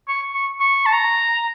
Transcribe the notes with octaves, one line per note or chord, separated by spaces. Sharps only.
C#6
C#6
C#6
A5
A#5